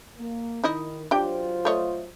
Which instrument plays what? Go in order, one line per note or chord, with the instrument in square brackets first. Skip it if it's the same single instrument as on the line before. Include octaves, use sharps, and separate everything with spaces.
[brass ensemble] A#3
[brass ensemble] D#3 [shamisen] D#4 E4 D#5
[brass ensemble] F#3 F4 C5 [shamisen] D4 G4 G5
[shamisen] A3 C#5 D#5